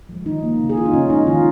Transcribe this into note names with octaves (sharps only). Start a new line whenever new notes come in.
F3 G#3
D#3 D#4
A#3
C#3
G#4
G#3 F4
D#4
C#3 C#4
F3 G#3 D#4
D#3 F4